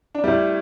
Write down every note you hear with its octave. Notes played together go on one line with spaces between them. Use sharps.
D4
A2 G3 E4